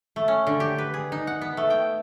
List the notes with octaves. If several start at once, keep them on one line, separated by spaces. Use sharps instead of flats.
A3
C#4
D3
G4
B4
G#4
D#4
F#5
B3
A3
G5